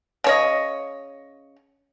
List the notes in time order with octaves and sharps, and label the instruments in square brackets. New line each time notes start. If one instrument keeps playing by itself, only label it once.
[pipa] C#3 C#5 D#5